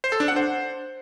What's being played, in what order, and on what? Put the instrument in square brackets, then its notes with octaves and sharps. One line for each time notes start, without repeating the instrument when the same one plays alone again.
[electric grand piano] C5
A4
D4
F#5
C5